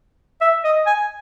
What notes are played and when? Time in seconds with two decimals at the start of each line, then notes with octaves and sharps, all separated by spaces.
0.41 E5
0.64 D#5
0.86 G#5